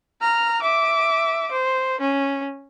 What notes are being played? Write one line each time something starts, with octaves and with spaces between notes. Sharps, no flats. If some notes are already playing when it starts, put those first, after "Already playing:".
A#5 F6
E5 D6
C5
C#4